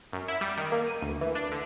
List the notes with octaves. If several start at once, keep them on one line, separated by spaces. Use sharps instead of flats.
F#2
E4
G3
D#3
A#3
D#7
D2
E3
D4
D3